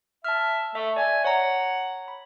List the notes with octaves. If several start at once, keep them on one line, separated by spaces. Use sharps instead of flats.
E5 A5 F6
A3 E5
D5 E5 G#5
C#5 F#5 A#5
B5